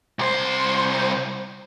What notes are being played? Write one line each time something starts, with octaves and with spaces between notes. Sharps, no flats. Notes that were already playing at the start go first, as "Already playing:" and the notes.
C2 C5